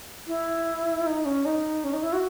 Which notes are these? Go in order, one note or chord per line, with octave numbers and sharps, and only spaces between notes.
E4
D#4
C#4
D#4
C#4
D#4
E4
F#4